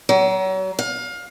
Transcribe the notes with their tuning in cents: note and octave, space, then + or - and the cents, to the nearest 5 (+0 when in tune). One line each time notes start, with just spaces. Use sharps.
F#3 +35
F5 +25